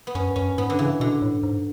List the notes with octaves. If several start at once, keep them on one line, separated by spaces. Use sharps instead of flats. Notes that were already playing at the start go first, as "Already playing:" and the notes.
B3
F#2 C#4
F#2 C#4
G#2 B3
D3
C#3 E3
B2 D3
A2
G#2